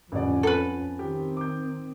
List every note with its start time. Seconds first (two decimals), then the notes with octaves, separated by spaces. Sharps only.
0.12 A1 F2 D3 C#4 D5
0.43 A4 B4 F#5
0.99 D#3 C4 G4
1.37 D6 G6